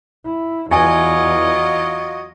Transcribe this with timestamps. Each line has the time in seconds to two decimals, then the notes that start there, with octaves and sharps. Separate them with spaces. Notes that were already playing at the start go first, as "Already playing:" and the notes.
0.25 E4
0.71 E2 E3 F#3 F4 D#5 G#5